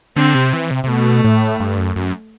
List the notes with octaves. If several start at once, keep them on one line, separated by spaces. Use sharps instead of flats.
D3 C4
C3
E3
C3
C3
B2 A3
A2
G2
F#2
F#2